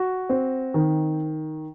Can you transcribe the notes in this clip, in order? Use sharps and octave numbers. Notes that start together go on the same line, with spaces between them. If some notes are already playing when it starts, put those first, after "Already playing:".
Already playing: F#4
C4
D#3